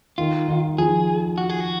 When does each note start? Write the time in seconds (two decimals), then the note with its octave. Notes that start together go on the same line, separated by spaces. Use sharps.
0.18 D#3 F4
0.48 D#3
0.78 F3 G#4
1.38 F#4
1.50 G#4
1.60 F#4